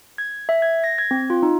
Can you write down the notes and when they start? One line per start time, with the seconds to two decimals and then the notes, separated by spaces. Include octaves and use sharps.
0.18 G#6
0.49 E5
0.62 G#6
0.84 A#6
0.98 G#6
1.11 C4
1.30 F4
1.43 D#4